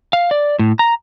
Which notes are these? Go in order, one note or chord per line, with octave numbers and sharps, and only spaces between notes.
F5
D5
A2
A#5